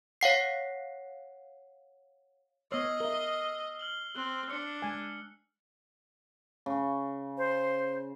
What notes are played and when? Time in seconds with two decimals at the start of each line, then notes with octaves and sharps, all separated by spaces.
0.21 C#5 F5 F#5 C7
2.72 B3 C#5 D#5 E6 F6 C7
3.00 A#4 E5 G7
3.79 F6 F#7 G7
4.16 C4 F#6
4.50 D4 C#7
4.82 G#3 G#5
6.66 C#3
7.38 C5